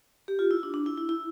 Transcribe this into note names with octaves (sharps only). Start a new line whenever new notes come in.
G4
F4
E4
D4
D4
E4
E4
E4